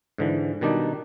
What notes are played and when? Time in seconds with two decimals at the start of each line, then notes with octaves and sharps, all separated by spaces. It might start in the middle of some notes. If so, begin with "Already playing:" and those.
0.18 G#2 D3 E3
0.61 B2 D#3 G3 D4 D#4